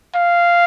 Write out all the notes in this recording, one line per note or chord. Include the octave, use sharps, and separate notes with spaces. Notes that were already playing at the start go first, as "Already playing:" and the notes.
F5